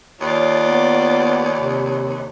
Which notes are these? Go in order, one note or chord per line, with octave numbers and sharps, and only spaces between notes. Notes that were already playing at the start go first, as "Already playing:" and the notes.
D#2 F4 C#5 D5
B3
C3